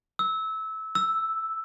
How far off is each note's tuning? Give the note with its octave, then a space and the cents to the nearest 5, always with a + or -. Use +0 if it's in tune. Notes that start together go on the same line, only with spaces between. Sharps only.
E6 -20
E6 +0